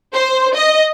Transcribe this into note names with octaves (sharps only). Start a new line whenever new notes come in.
C5
D#5